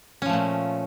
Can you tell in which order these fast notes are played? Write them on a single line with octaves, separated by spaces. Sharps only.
C#4 F3 A3 A#2